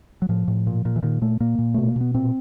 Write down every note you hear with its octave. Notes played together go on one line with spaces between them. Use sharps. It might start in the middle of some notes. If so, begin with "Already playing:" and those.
F#3
A2 F3
A2
A#2
A#2
E3
A#2 D#3
A#2 A3
A#2 A#3
A#2
B2 A3
A#3
B2 B3
A#2 C4